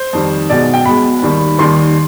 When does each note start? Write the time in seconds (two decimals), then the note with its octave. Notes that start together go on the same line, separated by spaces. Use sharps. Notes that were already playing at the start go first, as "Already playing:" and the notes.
Already playing: C5
0.13 F2 D#3 G3
0.50 B1 B2 G#3 D5
0.74 G5
0.85 B1 B2 G#3 B5
1.22 D#2 D#3 G3
1.58 D#2 D#3 G3 C6